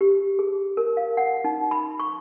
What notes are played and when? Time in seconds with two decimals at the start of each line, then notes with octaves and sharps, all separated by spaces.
0.01 G4
0.39 G#4
0.77 A#4
0.97 F5
1.17 F#5
1.44 D#4
1.71 B5
2.00 C#6